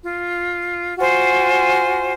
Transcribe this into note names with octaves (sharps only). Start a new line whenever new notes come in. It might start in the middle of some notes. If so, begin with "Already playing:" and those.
F4
F4 F#4 C5 G#5